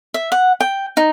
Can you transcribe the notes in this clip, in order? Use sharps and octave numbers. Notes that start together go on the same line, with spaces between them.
E5
F#5
G5
D#4